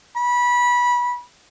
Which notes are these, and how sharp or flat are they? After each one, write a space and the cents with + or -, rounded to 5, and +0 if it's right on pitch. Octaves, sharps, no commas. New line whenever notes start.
B5 -20